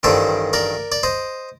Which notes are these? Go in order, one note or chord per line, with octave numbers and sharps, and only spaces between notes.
A1 G2 D#3 G3 D4 A4 C5
A#4 D5
D5
C5 D#5